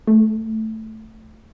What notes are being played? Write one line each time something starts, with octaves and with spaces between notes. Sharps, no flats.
A3